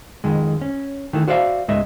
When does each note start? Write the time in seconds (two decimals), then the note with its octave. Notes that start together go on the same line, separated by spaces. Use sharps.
0.24 F2 D#3 G#3
0.61 C#4
1.13 D#3 E3 A3
1.28 F#4 C5 D5 E5 F5
1.68 C#2 G#2 G#3 D#5 E5